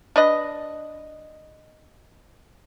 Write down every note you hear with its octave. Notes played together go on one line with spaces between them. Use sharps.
D4 B4 D#5